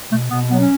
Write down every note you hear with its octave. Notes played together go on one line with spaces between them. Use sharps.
B2 A3
B2 B3
F#3 B3
C#4